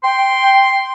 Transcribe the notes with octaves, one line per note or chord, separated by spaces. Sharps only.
G5 C6